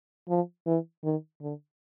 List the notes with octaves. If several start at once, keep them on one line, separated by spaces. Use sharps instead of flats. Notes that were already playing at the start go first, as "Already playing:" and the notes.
F3
E3
D#3
D3